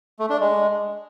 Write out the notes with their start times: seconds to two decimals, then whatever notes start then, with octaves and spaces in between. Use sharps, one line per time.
0.19 A3
0.30 D4
0.40 G#3